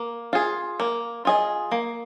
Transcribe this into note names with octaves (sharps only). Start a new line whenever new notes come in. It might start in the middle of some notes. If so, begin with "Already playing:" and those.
Already playing: A#3
F4 G#4
A#3
F4 G#4 D#5
A#3